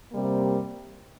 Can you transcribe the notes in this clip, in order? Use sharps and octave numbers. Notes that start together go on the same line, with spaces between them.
C3 G3 A#3